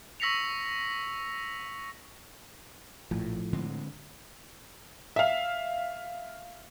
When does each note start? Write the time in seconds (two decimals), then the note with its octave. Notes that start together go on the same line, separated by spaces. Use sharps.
0.20 C#6 E6 A#6 B6 C#7 F7
3.11 A#1 A2 F3
3.53 D3 G#3 C4
5.16 E5 F5